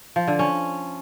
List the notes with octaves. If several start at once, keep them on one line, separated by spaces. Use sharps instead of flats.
F3
D3
C#4